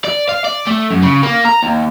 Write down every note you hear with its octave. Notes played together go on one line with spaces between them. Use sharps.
D5
F5
D5
A3
F#2
C#3
A#3
A#5
D#2